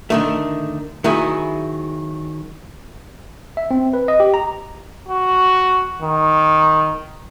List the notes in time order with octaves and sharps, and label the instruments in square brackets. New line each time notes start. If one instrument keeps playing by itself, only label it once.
[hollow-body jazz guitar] D3 D#3 A3
D#3 F#3 E4 G#4
[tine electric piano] E5
C4
B4
D#5
G4
A#5
[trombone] F#4
D#3